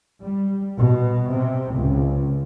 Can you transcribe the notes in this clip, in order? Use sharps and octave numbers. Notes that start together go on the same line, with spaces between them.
G3
B2
C3
C#2